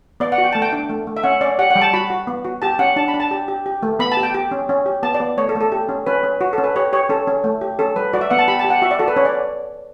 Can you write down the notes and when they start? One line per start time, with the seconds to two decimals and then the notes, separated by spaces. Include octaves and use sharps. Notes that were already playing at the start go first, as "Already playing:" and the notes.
0.20 B3 D5
0.32 F#5
0.38 F#4
0.44 G5
0.53 A3 A5
0.62 G5
0.73 D4
0.90 A3
1.07 A3
1.17 E5
1.23 C#4 F#5
1.41 C#4 D5
1.59 G4 F#5
1.71 F#5
1.75 G3 G5
1.82 A5
1.93 F#4 B5
2.10 F#4
2.27 B3
2.45 F#4
2.62 G4 A5
2.79 C#4 F#5
2.96 D4 A5
3.08 B5
3.14 D4
3.20 A5
3.31 G4
3.48 G4
3.66 G4
3.83 A3
3.99 B3 B5
4.12 A5
4.17 G4
4.23 G5
4.34 G4
4.51 C#4
4.69 C#4
4.86 G4
5.03 B3 A5
5.14 D5
5.20 B3
5.37 A3 C#5
5.49 A4
5.55 A3
5.61 A4
5.72 G4
5.89 C#4
6.06 C#4 B4
6.23 C#4
6.41 F#4
6.53 C#4 A4
6.64 B4
6.76 G4 C#5
6.93 G4 C#5
7.09 C#4 A4
7.28 C#4
7.44 A3
7.61 G4
7.79 C#4 A4
7.96 G3 B4
8.13 F#4 D5
8.21 E5
8.31 B3 F#5
8.39 A5
8.48 G4 B5
8.59 A5
8.65 G4
8.70 F#5
8.82 F#4 E5
8.91 D5
8.99 F#4 A4
9.08 B4
9.16 C#4 C#5
9.25 D5